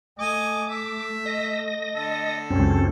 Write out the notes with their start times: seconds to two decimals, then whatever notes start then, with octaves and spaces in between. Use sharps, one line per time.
0.19 A3 D#5 G#5 D6
0.69 E5
1.26 D#5 A#6
1.95 D3 A4
2.50 C#2 F#2 C4 C#4